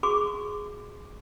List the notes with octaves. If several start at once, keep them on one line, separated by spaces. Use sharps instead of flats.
F#4 G#4 C#6 D6